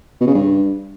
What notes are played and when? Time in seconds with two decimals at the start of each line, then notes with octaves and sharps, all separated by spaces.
0.20 B2
0.27 C#3
0.34 G2